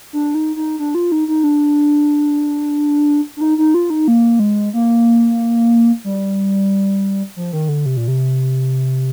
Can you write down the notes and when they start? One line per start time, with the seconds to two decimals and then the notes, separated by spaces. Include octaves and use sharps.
0.13 D4
0.35 D#4
0.56 D#4
0.79 D4
0.95 F4
1.12 D#4
1.28 D#4
1.44 D4
3.37 D4
3.41 D#4
3.58 D#4
3.74 F4
3.90 D#4
4.08 A#3
4.39 G#3
4.73 A#3
6.04 G3
7.36 F3
7.53 D#3
7.69 D3
7.86 C3
7.97 A#2
8.08 C3